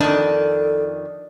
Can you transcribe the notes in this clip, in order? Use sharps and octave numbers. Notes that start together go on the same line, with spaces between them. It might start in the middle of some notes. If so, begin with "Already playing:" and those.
F2 D#3 D4 A4